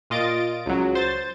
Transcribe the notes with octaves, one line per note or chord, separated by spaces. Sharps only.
A#2 F4 D#5 A6 D7
C#2 F#3
C5 A6